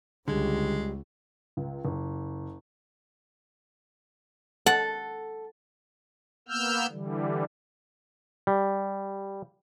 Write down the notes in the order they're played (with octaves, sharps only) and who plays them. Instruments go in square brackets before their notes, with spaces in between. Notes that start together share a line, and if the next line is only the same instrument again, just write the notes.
[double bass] C#2 [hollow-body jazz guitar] D3 [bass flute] G3 [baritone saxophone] G#3
[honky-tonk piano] C#2
F#1
[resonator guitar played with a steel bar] A4 [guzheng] F#5
[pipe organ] A#3 B3 E6 F6 G6
D3 E3 G3
[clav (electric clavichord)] G3